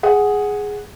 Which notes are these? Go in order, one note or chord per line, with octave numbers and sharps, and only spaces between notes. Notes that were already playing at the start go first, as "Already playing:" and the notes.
G#4 F#5